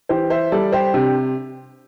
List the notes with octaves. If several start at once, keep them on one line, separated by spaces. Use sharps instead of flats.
E3 G4 C5
C5 E5
G3 A4 D5
G4 C5
C3 D4 G4